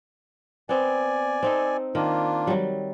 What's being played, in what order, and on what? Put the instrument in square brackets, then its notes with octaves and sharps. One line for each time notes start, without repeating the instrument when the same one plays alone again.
[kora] B3 C4 [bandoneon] D5 G#5
[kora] C4 D#4 A4
[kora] D#3 [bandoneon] A#3 D4 F4
[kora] F#3 G3